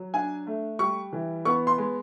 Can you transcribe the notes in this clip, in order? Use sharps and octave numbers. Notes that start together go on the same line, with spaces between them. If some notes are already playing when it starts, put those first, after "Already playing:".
Already playing: F#3
D4 G#5
A3
G3 C#6
E3
B3 C#6
C6
G#3